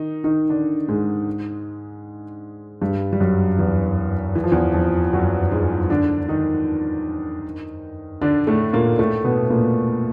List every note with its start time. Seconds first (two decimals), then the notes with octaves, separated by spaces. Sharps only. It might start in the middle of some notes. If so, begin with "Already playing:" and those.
Already playing: D#3 D#4
0.24 D#3 D#4
0.49 D3 D4
0.88 G#2 G#3
2.82 G2 G3
3.13 G3
3.20 F#2 F#3
3.58 E2 E3
4.35 E3
4.44 F3
4.52 E2 E3
4.74 F2 F3
5.13 F#2 F#3
5.51 G#2 G#3
5.90 D3 D4
6.29 D#3 D#4
8.22 D3 D4
8.47 A2 A3
8.73 A#2 A#3
8.99 A2 A3
9.24 B2 B3
9.50 A#2 A#3